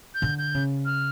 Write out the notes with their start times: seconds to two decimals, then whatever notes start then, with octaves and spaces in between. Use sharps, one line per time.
0.15 G6
0.22 D3
0.38 G6
0.54 C#3
0.85 F6